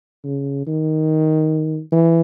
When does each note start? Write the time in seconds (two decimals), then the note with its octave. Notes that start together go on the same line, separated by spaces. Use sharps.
0.24 C#3
0.67 D#3
1.92 E3